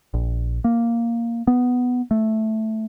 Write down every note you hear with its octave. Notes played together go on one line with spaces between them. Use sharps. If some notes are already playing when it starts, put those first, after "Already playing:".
A#1
A#3
B3
A3